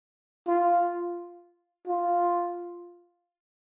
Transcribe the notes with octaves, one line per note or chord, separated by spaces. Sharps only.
F4
F4